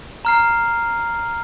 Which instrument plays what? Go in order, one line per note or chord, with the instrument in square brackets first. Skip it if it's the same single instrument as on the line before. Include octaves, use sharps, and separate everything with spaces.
[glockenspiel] A#5 F6 C7